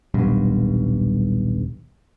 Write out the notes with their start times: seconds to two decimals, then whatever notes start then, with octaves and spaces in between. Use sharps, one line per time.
0.14 D#1 B1 G2